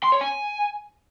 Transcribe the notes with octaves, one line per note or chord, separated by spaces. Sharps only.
C6
C#5
G#5